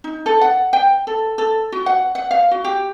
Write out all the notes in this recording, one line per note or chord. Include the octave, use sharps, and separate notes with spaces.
D#4
A4
F#5
G5
A4
A4
F#4
F#5
F#5
F5
F#4
G4